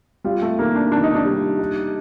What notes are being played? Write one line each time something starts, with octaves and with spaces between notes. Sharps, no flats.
G3 F4
A3
D#3 A#3
D4
D#3 D4
D#4
D4
G3
D#4